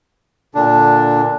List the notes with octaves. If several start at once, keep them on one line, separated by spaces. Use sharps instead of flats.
A#2 D3 D4